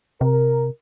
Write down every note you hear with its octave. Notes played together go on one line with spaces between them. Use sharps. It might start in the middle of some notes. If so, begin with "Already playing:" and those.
C3 A#4